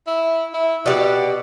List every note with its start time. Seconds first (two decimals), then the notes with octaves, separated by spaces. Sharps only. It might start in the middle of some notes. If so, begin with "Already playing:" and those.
0.07 E4
0.54 E4
0.86 B2 F#4 G4 D5